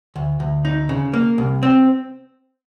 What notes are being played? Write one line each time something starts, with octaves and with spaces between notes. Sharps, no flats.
D2
D2
D#4
C#3
A#3
C2
C4